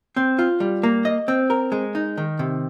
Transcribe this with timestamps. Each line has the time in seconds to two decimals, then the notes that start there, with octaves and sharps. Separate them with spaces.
0.16 C4
0.39 F4
0.60 G3
0.83 A#3
1.05 D#5
1.28 C4
1.50 A#4
1.72 G#3
1.95 D#4
2.17 D#3
2.39 C3